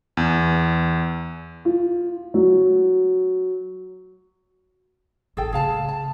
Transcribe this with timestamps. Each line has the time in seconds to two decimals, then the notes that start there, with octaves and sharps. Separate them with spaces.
0.17 E2
1.65 F4
2.34 F#3
5.37 A1 G#4 A4 G5
5.53 C#3 A3 G#4 F5 A5
5.89 A5